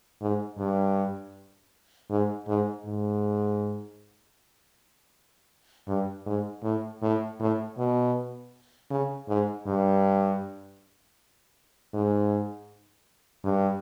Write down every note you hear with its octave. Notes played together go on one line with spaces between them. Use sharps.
G#2
G2
G#2
G#2
G#2
G2
G#2
A2
A2
A2
B2
C#3
G#2
G2
G#2
G2